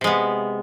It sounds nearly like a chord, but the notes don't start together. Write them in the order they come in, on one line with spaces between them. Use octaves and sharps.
C3 G#3 B3